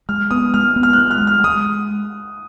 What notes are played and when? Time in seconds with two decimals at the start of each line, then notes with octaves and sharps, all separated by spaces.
0.09 G#3 F6
0.31 B3 D#6
0.54 G#3 F6
0.76 B3
0.83 F6
0.93 G#3 F#6
1.11 F6
1.21 G#3
1.27 F6
1.44 G#3 D#6